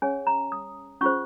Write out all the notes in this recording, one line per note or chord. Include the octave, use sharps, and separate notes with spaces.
C#4 G#4 C#5 G#5
A#5
D#6
C#4 F4 G#4 C5 C#6